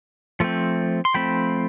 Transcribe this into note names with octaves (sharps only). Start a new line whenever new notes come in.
F3 A3 C4
C6
F3 A3 C4 G5 B5